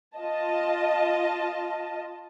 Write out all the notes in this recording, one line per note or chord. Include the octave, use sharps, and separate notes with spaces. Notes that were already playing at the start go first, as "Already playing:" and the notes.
F4 D#5 A5